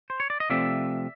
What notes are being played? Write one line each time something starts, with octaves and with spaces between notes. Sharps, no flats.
C5
C#5
D5
D#5
C3 F3 A3 C4 D5 E5